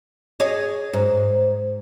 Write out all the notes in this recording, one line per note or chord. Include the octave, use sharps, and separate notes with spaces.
G#4 C#5 D#5
G#2